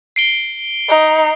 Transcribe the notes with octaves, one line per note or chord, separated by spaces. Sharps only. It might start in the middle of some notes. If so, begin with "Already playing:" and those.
C7 D7 G7
D#4